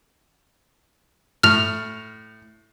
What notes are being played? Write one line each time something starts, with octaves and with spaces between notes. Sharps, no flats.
A2 F6 F7